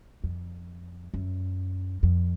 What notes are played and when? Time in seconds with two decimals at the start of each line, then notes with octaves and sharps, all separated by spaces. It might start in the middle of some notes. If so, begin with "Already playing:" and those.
0.24 F2
1.14 F#2
2.03 F2